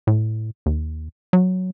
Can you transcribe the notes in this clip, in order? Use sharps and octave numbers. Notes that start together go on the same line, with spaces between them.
A2
D#2
F#3